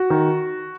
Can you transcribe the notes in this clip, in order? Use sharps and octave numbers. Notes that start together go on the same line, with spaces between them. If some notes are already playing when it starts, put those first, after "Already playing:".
Already playing: F#4
D#3